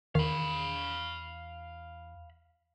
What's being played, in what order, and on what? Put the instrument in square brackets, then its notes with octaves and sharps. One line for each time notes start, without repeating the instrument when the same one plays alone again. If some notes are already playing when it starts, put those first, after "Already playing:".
[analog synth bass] E2 [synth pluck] D#3 [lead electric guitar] F5 B5